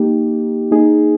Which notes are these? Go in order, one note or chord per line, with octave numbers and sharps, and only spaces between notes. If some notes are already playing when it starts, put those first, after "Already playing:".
Already playing: A#3 D#4 G4
A#3 D#4 G#4